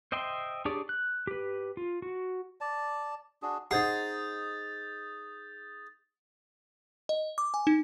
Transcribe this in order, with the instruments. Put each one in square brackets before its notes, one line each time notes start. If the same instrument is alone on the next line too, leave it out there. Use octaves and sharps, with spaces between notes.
[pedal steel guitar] C5 D#5 E5 G5 C6
D4 G4 G#4 C#5 D5
F#6
G4 B4
F4
F#4
[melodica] D5 A5
D4 F#4 G#4
[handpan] D#4 C5 D#5 [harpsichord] G#4 [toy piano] F#5 [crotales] D#6 G6 A6
[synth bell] D#5
D6
G#5
D#4